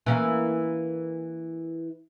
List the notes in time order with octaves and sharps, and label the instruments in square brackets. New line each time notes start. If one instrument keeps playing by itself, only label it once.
[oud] E3 A#3 C#4